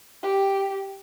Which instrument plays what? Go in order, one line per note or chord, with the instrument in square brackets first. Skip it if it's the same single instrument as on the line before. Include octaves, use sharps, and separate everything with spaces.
[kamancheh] G4